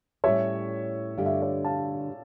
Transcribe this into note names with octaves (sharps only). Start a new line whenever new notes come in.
A2 G3 C#4 G4 C#5 E5
G2 D3 A3 D4 G4 F5
E5
D5
C#5 E5
F5 A5